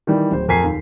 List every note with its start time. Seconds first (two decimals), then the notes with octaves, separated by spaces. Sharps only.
0.07 D#3 E3 G3
0.31 D1 C5
0.48 F2 A#4 G#5 B6 C7
0.64 D#2